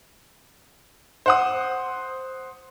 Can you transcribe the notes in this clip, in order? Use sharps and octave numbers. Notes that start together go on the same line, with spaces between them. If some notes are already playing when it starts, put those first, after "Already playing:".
C5 F#5 D#6